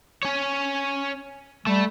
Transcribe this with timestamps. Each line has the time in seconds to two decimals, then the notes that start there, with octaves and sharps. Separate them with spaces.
0.23 C#4 C#5
1.67 G3 A3